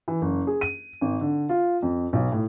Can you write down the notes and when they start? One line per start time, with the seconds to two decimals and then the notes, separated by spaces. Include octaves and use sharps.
0.08 E3
0.22 F#1
0.47 G#4
0.61 D#7
1.01 G#1
1.21 D3
1.49 F4
1.82 F2
2.13 B1
2.32 A2